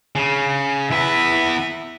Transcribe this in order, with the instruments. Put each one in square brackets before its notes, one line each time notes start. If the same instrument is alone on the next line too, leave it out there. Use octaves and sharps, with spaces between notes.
[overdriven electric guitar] C#3
[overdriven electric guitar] E2 B4 [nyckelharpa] E5